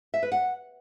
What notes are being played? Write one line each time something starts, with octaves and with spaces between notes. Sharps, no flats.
E5
B4
F#5